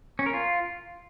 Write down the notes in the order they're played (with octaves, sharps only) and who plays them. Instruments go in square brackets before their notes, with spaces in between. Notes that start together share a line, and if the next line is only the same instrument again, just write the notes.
[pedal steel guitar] C#4
A#4
F4